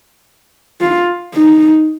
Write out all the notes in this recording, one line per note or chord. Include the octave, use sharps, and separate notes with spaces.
F4
D#4